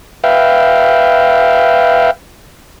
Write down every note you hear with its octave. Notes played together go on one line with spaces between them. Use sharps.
B4 E5 F5 G5